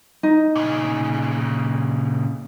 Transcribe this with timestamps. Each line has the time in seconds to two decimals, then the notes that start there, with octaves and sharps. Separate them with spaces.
0.23 D#4
0.55 A#2 C#3